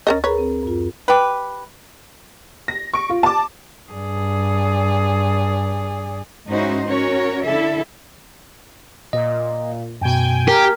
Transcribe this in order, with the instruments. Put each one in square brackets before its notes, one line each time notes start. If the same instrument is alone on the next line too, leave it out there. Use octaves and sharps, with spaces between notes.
[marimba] D2 A6 [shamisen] C#4 A#4 D#5
[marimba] G#4 A#4 A#5 [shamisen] B4 C#5
[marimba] C4
F#2 F4
[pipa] G4 B4
[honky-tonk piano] A#6
C#6 D7
F4
A5 D6
[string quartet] G2 G#4 D5
[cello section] G#2 C#4 D#4 E4 F#4 C5
C#4 F#4 A#4 C#5
D3 E4 A4 E5
[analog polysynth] A#2 [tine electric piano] D#5
[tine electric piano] F#2 B2 [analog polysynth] G5 G#5
[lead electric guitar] G4 [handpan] A#4